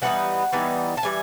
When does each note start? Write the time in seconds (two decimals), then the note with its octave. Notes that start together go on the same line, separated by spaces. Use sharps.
0.02 E3 G3 B3 D#4 F#5
0.52 E3 G3 B3 D#4
0.97 A5
1.03 E3 G3 G#5